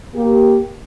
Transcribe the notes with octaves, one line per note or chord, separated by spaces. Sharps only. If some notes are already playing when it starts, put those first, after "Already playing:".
A#3 G4